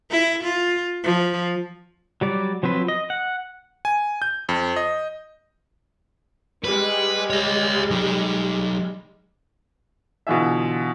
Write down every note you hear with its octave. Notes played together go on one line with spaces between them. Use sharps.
E4
F4
F3
F#3 G3 D5
F3 F#3 C4 B4
D#5
F#5
G#5
G6
F2
D#5
G3 G#3 B4
C#5 D#5
F#3 D#4
B2 D3 E3 F4 G#4 E5